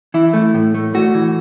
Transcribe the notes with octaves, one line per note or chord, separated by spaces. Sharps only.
E3 E4
A3
A2
A3
A3 F#4
E3